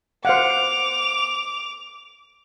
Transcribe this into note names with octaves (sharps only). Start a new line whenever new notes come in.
C5 F5 F#5 D6 F7